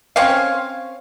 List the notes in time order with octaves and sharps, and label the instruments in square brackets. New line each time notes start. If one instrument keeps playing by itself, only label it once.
[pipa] C4 C#4 C#5 F5